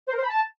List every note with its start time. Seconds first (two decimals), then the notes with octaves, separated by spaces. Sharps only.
0.08 C5
0.13 A#4
0.19 C5
0.24 B5
0.29 A5